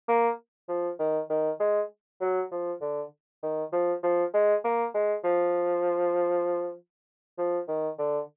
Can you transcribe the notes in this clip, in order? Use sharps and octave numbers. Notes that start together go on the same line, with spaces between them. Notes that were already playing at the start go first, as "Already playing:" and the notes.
A#3
F3
D#3
D#3
G#3
F#3
F3
D3
D#3
F3
F3
G#3
A#3
G#3
F3
F3
D#3
D3